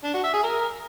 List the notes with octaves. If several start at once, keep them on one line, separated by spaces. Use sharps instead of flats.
D4
F#4
E5
G#4
A#4